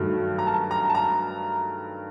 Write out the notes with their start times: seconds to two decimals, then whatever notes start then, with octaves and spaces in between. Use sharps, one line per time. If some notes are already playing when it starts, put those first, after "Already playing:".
Already playing: G2 D#3 F#3 A3
0.39 A#5
0.47 A5
0.71 A#5
0.89 A5
0.95 A#5